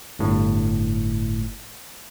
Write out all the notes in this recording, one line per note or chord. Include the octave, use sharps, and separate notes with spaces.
G1 A2